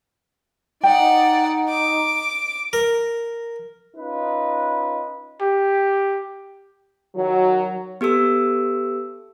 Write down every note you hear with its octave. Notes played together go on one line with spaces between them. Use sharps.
D#4 D5 F#5 G5
D6
A#4
C#4 D#4 F4 B4
G4
D#3 F#3
B3 G4 A4 E6